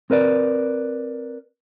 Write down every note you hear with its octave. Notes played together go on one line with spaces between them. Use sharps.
C4 A#4 B4 D5